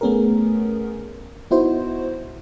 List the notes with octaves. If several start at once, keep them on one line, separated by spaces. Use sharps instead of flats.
A3 B3 C#4 G#4 A#4
B3 D#4 E4 F#4 C5